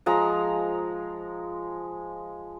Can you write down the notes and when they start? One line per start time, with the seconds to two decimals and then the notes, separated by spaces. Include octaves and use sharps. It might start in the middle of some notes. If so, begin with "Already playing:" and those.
0.06 F3 G#3 A#5